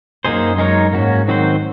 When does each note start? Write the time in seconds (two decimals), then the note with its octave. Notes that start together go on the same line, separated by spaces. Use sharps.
0.24 F#2 A#3 D#4 G#4 C5
0.58 G#3 D#4 A#4 C#5
0.93 G#2 F#3 A#3 C#4 F#4
1.28 D#3 F#3 C4 F#4 C5